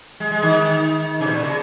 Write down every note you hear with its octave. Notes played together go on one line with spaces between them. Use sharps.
G#3
G#3
D#3
C#3
B2
A#2
C#3